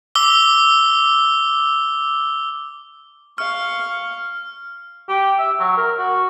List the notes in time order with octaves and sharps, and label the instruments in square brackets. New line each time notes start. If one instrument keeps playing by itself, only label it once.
[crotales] D6 E6 G7
[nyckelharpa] F5 C#6 [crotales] F6
[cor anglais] G4
E5
F#3
A#4
F#4